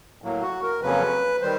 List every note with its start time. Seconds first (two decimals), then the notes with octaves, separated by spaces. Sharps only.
0.22 A2 F#3 A#3
0.42 F#4
0.62 A#4
0.82 F2 C#3 F#3 A#3 C#4 B4
1.41 D#3 G3 C5